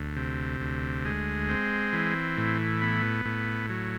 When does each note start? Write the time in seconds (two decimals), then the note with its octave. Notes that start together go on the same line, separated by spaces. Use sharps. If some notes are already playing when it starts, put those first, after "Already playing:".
Already playing: D2
0.16 C3
0.60 D2
1.05 G#3
1.49 C4
1.93 E3
2.37 A2
2.82 B3
3.25 A2
3.69 F#3